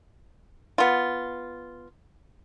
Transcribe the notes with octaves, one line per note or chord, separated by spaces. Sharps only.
B3 F4